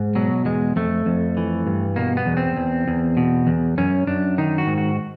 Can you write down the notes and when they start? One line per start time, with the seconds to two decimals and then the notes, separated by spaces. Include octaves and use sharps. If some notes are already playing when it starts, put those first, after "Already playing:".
Already playing: G#2
0.15 B2 F#3
0.45 E2 G#3
0.76 F2 A3
1.06 F2
1.37 E3
1.67 G2
1.96 B2 A#3
2.17 B3
2.26 E2
2.37 C4
2.57 E2
2.88 E2
3.17 B2
3.47 E2
3.78 F#2 C#4
4.07 F#2 D4
4.38 D#3 D#4
4.58 F#4
4.67 G#2
4.78 F#4